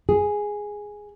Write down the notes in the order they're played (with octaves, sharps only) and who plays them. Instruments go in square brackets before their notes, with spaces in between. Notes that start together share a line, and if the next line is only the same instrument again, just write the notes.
[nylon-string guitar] G#4